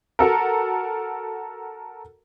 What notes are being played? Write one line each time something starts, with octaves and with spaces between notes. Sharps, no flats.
F#4 A4 A#4